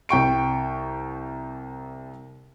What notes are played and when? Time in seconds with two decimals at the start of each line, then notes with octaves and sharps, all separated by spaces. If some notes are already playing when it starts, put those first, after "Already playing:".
0.09 C2 G5 C#6 D7